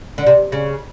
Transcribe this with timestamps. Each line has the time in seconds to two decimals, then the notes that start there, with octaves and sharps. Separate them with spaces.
0.18 D3
0.27 C3
0.52 C#3